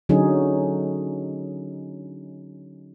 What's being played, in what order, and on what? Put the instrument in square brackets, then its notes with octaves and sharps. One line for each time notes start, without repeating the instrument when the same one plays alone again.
[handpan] D3 F#3 C#4 D#4 G#4